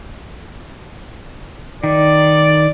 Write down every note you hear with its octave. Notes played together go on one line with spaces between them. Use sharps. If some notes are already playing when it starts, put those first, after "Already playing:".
D#3 D5